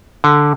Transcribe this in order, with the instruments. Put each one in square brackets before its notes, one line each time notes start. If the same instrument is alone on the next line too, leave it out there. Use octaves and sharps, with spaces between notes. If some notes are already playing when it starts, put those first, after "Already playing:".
[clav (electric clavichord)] D3